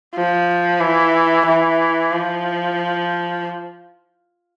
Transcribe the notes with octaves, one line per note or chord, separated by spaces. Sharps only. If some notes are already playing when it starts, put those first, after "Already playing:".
F3
E3
E3
F3